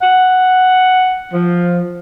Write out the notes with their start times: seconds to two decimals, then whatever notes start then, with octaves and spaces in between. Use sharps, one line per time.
0.02 F#5
1.33 F3